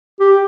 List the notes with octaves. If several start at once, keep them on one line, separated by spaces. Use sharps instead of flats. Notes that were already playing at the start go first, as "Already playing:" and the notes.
G4